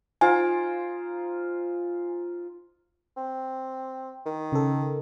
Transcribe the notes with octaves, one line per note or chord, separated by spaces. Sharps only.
D#4 F4 C5 G#5
C4
D#3
C#3 A4